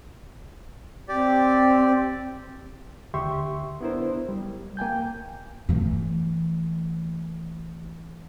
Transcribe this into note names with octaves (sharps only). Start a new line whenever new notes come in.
C4 G4 D5
D2 D3 G4 E5 C6 C#6
B3 D4 E4 A#4 C5
G3
A#3 G5 G#5 G6
E3 A3